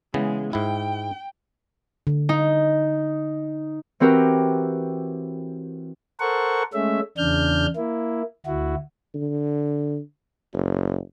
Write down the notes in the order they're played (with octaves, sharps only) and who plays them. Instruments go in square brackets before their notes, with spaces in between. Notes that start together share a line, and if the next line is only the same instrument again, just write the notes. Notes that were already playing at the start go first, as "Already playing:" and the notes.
[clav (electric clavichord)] C#3 E3 B3 [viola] G#3
[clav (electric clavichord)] G#2 E4 [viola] G5
[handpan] D3
[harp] D#4
E3 C4 F#4 G4 A#4
[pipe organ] A4 A#4 C5 F#5 C#6
G#3 A3 C#4 E5
E2 C#3 D4 F6 G6
A#3 E4
D2 E4 F#4
[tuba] D3
F#1